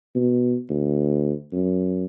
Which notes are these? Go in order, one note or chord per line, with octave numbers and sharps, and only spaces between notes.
B2
D2
F#2